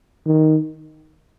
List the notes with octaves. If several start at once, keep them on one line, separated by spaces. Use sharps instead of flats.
D#3